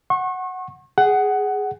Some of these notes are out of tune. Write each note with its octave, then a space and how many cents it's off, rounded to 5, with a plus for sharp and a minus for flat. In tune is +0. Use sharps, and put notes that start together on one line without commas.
F#5 +0 C#6 -35
G#4 +0 F#5 +15